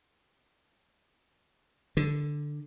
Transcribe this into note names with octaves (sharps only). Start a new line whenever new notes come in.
D3